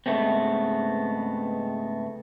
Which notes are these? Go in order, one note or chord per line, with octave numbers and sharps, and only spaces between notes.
G#2 C#3 A3 B3 C4